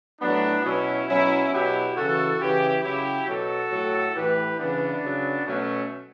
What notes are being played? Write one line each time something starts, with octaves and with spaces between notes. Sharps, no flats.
A2 F#3 B3 D4
B2 F#3 C#4 E4
B2 F#3 C#4 E4
B2 F#3 E4 G4
C#3 E3 F#4 A4
C#3 E3 E4 G4
C#3 F#3 E4 G4
B2 F#3 F#4 A4
A2 F#3
A2 E3 G4 B4
C#3 E3 B3 D4
C#3 F#3
B2 F#3 A3 C#4